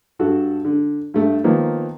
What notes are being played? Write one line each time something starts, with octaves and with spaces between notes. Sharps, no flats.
G2 F#4 A4
D3
G2 A3 A4
D#3 F3 A#3 B3